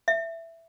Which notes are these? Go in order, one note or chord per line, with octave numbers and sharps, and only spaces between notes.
E5